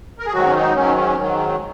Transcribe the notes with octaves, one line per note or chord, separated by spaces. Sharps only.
A#4
G#4
G#2 D#3 F#3 F#4
C#4
D#4
G#2 D#3 F#3 C#4
C#4
G#2 D#3 F#3